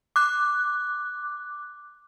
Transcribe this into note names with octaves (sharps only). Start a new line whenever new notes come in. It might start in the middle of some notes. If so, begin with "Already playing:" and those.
D6 F#6